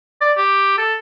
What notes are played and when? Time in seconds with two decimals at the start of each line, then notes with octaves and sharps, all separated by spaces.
0.21 D5
0.37 G4
0.78 A4